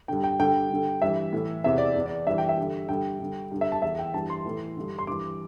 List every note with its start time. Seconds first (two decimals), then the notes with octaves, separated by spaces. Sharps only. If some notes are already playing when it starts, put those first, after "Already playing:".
0.08 G2 D3 G5
0.24 G5
0.39 G2 D3 G5
0.70 G2 D3
1.02 G2 E3 E5
1.33 A2 E3
1.64 E2 C3 E3 E5
1.78 D5
1.96 E2 E3
2.06 D5
2.27 G2 E3 E5
2.38 G5
2.49 E5
2.57 G2 D3
2.89 G2 D3 G5
3.20 G2 D3
3.51 G2 D3
3.61 E5
3.72 A5
3.82 E2 E3 E5
3.99 G5
4.14 G2 E3 A5
4.30 C6
4.46 A2 E3
4.77 G2 D3
4.99 C6
5.07 G2 E3 D6